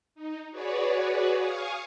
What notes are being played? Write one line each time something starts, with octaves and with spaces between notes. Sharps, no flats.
D#4
F#4 G#4 B4 C#5 D5
F5 G#5 C#6 D#6